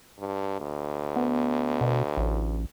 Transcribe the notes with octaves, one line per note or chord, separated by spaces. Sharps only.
G2
D2
B3
B2
A1